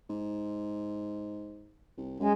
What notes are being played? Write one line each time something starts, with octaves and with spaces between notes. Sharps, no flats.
G#2
C2
F#2 G#3